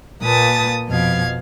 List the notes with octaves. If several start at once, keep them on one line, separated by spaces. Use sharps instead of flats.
A#2 A#3 B4 A5 D#6 A6
F2 B2 F5 G#6